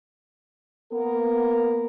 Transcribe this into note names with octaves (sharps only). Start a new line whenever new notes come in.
A#3 B3 A#4